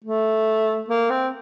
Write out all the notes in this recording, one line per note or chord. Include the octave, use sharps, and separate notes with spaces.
A3
A#3
C4